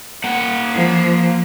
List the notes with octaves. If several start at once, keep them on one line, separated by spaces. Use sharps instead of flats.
A#3 F#5
F3